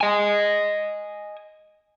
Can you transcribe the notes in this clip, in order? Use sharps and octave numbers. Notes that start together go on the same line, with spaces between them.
D#5 G#5